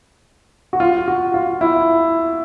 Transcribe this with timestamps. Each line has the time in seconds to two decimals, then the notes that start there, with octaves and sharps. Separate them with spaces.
0.73 F#4
0.80 F4
1.08 F#4
1.34 F4
1.61 E4